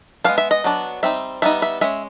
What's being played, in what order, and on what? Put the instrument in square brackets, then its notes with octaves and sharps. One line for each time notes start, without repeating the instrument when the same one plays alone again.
[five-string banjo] G#3 B3 D4 F5
E5
D#5
F#3 B3 D4
G3 C4 D#4 E5
G3 B3 D#4 E5
E5
G#3 C#4 E5